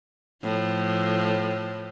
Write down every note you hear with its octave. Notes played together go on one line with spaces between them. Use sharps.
A2 F3